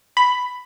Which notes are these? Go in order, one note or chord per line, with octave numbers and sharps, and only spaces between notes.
B5